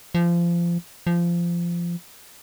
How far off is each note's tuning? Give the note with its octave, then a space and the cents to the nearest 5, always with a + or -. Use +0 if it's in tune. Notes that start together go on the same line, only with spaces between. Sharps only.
F3 -25
F3 -20